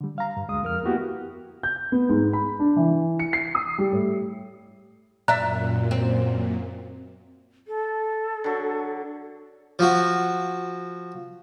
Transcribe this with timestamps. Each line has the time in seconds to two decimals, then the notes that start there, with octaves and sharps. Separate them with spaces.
0.01 D3 G3
0.18 F5 A#5
0.37 G2
0.49 D2 G#3 F5 D#6
0.63 F2 A#4 F6
0.83 A#3 B3 E4 F#4 G4
1.63 G6
1.92 B3
2.09 G#2
2.33 B5
2.59 D4
2.76 E3
3.19 C#7
3.33 C7
3.55 D#6
3.78 G3
3.92 A2
5.28 F#2 A#2 D5 E5 A#5 F#6
5.91 C4
7.67 A4
8.44 D3 F#3
9.79 F3 F#4